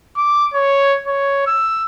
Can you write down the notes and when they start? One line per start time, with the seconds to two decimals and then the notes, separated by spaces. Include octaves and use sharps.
0.17 D6
0.54 C#5
1.07 C#5
1.47 E6